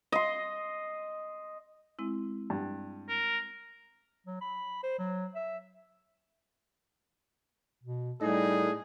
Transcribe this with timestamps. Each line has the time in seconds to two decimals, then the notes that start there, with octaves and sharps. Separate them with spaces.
0.12 D#5 C6
1.99 G#3 C4 E4
2.50 G2
3.09 A#4
4.27 F#3
4.41 B5
4.83 C5
4.99 F#3
5.35 E5
7.84 B2
8.21 A2 G3 D#4 G#4